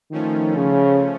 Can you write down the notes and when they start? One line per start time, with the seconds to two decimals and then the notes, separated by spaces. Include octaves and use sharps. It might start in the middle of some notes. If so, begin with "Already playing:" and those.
0.11 D#3 F3 A3 C#4
0.56 C#3